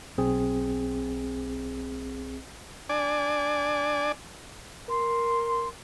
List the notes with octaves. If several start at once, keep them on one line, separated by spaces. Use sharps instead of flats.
B1 C4 G#4
D4 D5 G#5
A#4 C6